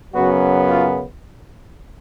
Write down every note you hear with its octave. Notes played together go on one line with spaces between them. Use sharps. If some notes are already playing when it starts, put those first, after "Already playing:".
F#2 C#3 F#3 B3 F#4
F4